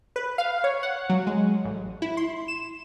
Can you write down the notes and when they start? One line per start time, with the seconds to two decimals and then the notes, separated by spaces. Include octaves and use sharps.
0.16 B4
0.38 F5
0.64 C#5
0.83 F#5
1.10 F#3
1.27 G#3
1.65 A1
2.02 E4
2.17 C6
2.48 E7